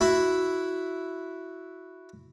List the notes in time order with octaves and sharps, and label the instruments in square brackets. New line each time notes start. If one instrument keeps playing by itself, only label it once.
[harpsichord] E4 F#4